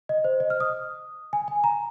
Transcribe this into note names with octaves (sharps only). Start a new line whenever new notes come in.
D#5
C5
D#5
F6
D#6
G#5
G#5
A#5